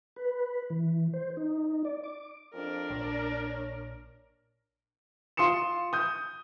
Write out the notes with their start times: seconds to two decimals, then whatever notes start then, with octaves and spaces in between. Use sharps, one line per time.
0.16 B4
0.70 E3
1.14 C5
1.37 D#4
1.85 D5
2.04 D6
2.53 F2 D4 A#4
2.90 A#1 C#5
5.37 F4 C6 D#6 C#7 E7
5.93 D#6 G6